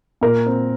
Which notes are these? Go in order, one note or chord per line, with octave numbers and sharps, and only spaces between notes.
A#2 A#4
C4